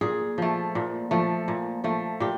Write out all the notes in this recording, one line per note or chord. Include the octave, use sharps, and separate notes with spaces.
A#2 G#4
F3 A3
A#2
F3 A3
A#2
F3 A3
A#2 G4